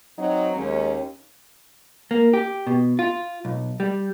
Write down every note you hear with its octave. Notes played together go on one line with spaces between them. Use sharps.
F#3 C4 D#4
D#2 G#3 C#4
A#3
G4
B2
F4
B1
G3